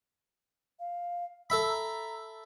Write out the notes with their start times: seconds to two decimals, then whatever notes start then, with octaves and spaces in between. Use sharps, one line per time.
0.79 F5
1.50 A4 E5 B5 E6
1.69 A#5